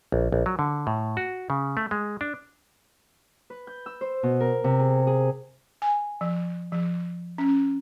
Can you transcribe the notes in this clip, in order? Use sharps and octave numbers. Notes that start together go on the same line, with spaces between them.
A#1
A#1
F#3
D3
A2
F#4
C#3
A3
G#3
D4
B4
G6
E6
C5
B2
A#4
C3
G#4
G#4
G#5
F3
F3
C#4